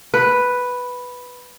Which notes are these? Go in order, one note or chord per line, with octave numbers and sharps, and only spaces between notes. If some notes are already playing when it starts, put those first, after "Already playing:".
B4